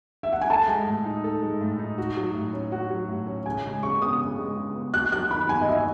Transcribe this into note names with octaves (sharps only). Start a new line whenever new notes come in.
E5
F#5
G#5
A4 A5
G#3
A2
D#4
A4
G#3
A2
D#4
F#4
F#3
A2
C#4
F#4 F#5
F#3
A2
C#4
C#3 G#5
G#3
C#3 C#6
B3 D#6
C#3
G#3
C#3
B3
F#4 F#6
F#3 F#6
D#3 B5
B3 G#5
D#5
F#4 E5